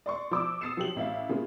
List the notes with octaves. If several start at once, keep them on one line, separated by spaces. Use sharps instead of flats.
D5 C6 C#6
F3 D6 E6
D#6 E6 A6 C7 C#7 E7
F3 F#3 G4 F#7
A1 E5 F5
C#3 A#3 F4